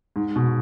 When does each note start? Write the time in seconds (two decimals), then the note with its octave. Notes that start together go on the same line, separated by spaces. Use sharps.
0.16 G#2
0.36 B2